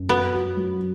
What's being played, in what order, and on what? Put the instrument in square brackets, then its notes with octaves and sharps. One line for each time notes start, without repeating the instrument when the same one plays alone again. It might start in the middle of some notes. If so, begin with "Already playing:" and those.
Already playing: [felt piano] F#2
[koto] B3 [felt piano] F#4
[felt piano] F#4
F#3